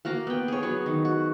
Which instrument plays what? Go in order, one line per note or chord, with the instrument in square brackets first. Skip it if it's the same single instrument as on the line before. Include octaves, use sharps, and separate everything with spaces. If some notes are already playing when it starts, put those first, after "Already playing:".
[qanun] A#3 F#4 F5 A#5
B3 G5
G#4 C#5
F#3 B3 C#5
D#3
F#4